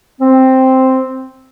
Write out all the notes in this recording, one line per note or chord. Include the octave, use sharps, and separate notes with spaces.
C4